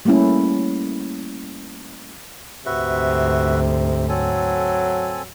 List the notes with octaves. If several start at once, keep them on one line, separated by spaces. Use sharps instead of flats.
G3 A3 A#3 C#4 E4
D2 G#2 C3 F#4 B4 E5
F#3 C4 A4 G#5